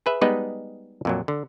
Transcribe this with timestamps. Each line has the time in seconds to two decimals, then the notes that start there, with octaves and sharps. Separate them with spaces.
0.06 G#4 B4 E5
0.21 G3 G#3 B3 D#4 B4 D#5
1.05 F2 A#2 F#3
1.28 D3